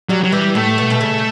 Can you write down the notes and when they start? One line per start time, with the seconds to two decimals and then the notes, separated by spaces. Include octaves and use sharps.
0.09 F#3 G3
0.24 F#3
0.32 E3 G3
0.55 A2 A3
0.78 B2
0.90 B2
1.01 C#3